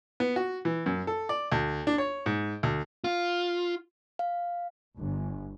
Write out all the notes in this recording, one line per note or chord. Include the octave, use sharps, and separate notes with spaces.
B3
F#4
E3
F#2
A4
D5
D2
D4
C#5
G#2
D2
F4
F5
G1